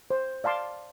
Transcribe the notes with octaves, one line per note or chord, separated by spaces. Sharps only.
C5
D5 F5 A5 C6 D6